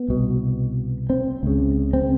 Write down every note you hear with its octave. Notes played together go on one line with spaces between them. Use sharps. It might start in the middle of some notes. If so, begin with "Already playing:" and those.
Already playing: B3
C2 B2
C4
C#2 C#3
C4